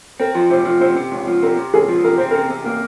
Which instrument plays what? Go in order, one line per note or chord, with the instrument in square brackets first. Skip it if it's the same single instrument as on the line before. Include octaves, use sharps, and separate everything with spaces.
[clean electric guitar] C4 [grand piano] A#4
[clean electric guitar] F3
[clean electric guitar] C3 [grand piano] C5
[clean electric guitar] F3
[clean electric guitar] C3 [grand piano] C5
[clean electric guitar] C3
C#2
F3
[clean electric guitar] C3 [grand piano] A#4
[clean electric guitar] C3
[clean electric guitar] C#2 [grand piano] G#4
[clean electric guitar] F3
[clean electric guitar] C3 [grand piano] A#4
[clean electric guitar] C4 [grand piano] C5
[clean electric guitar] C3 [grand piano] A#4
[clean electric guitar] C3
A#3